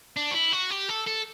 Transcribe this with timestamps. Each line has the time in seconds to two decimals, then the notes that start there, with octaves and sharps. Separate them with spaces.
0.17 D4
0.31 F#4
0.34 E4
0.53 F#4
0.71 G4
0.89 A4
1.07 A4